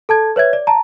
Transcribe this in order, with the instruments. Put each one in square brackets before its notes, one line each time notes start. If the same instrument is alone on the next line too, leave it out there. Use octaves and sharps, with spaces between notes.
[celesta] A4 A5 G#6
B4 C#5 E5 G#6
D5
A5 A#5